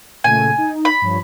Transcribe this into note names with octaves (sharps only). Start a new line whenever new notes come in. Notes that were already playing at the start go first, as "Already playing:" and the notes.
A#2 C#3 A3 G#5
D#4
B5
G2 F3 C#5